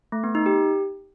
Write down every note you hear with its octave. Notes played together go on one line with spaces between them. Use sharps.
A3
B3
D#4
G4